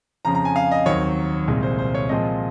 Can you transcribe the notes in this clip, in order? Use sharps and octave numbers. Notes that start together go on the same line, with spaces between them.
F2 C#3 F3 A#5
A#5
G#5
F5
D#5
D#2 D#3 F#3 C4 C#5
C2 A#2 G#3
C5
C5
C#5
A#2 F3 G#3 C4 D#5